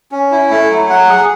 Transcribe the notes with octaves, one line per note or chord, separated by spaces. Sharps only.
C#4
E4
A3
F#3
F#5
G#4